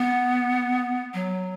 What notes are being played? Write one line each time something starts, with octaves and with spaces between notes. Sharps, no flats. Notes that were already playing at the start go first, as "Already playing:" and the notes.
Already playing: B3
F#3